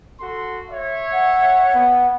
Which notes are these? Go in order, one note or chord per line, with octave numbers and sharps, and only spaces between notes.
F#4 A4 C6
C#5 E5
F#5
B3